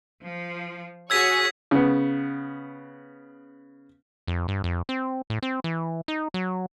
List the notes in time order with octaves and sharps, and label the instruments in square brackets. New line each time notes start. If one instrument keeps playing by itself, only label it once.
[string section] F3
[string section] F#4 G#4 C#5 [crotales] E6 G#6 B6
[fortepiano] C#3 B3
[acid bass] F2
G2
F2
C4
A2
C4
E3
D#4
F#3